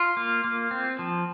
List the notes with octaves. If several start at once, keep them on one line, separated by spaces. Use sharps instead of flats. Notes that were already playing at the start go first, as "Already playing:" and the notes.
Already playing: F4
A#3
A#3
C4
F3